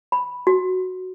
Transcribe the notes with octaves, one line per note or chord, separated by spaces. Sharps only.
B5
F#4